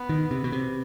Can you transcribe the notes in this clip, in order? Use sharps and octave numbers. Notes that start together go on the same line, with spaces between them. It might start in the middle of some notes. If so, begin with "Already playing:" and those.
Already playing: B3
D#3
C3
B2
C3